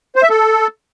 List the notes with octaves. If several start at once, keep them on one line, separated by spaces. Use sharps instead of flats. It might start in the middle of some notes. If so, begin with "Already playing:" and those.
C5
E5
A4